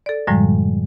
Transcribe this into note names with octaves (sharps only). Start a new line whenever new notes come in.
A4 D5
F#2 A2 D3 F3 G3 G#3